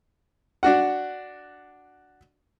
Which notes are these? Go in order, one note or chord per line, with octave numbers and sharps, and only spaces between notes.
D4 F#4 F#5